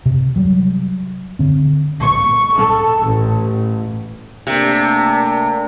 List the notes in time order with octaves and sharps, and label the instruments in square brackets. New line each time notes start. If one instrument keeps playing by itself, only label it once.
[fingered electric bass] C3
F#3 G3
D3 C4
[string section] C#6
A4
A1
[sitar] C3 [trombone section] A3 A#3 D4